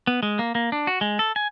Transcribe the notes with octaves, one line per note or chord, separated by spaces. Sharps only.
B3
G#3
A#3
A#3
D4
F#4
G#3
A4
G#5